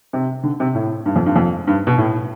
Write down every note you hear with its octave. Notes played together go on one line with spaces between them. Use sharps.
C3
D3
C3
A2
G2
F2
G2
F2
G2
B2
A2